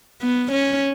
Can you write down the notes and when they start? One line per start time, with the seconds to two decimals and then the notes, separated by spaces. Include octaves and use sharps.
0.21 B3
0.52 C#4